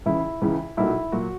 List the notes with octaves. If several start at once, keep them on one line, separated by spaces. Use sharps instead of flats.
C#2 C#3 E3 E4
C#2 C#3 E3
B1 A#2 F#3 E4
A#2 F#3 F#4